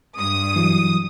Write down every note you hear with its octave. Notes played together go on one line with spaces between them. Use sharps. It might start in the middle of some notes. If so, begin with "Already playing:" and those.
G2 D#6
E3 F#3